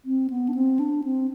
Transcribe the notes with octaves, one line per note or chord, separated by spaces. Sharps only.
C4
B3
D4
C4
D4
C4